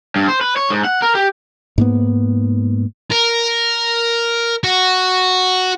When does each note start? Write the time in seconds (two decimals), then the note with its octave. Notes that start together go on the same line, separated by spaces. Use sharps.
0.16 G2
0.28 C5
0.41 B4
0.56 C#5
0.70 G#2
0.85 F#5
1.02 A#4
1.15 G4
1.78 G#2 A#3 B3
3.12 A#4
4.64 F#4